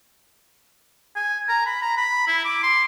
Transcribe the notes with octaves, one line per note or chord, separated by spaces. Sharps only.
G#5
A#5
B5
A#5
B5
E4
D6
C6